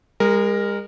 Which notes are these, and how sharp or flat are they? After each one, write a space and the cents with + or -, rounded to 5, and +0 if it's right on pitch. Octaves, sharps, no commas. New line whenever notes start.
G#3 -40 A#4 +0